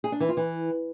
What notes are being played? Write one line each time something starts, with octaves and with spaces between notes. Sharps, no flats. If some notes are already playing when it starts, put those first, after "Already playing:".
G#4
D4
E3
F4
E3